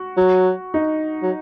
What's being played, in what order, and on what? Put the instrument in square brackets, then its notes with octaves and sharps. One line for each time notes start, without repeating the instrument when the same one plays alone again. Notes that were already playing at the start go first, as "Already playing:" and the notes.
Already playing: [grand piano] F#4
[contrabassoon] F#3
[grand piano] D#4
[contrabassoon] F#3